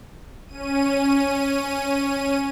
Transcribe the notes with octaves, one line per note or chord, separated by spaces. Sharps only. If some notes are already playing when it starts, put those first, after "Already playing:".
C#4 D#7